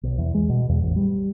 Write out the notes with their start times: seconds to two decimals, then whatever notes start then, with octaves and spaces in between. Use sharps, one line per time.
0.03 B1
0.18 E2
0.34 G#3
0.49 B2
0.69 E2
0.82 A1
0.96 G3